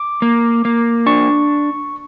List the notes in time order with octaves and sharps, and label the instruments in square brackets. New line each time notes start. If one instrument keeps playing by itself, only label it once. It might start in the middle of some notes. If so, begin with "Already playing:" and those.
Already playing: [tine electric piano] D6
[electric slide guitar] A#3
A#3
[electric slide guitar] D4 [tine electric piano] C#6